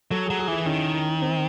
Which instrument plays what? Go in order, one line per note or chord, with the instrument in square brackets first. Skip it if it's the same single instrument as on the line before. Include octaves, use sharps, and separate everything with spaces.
[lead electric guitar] F#3 [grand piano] A4
[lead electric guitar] F#3 [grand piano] G#4
[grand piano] G#4
[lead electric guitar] E3 [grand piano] E4
[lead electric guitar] D#3 [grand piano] C#4
[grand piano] C4